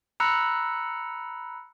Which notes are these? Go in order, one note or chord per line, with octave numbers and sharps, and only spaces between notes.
A#5 B5 E6 F#6 C#7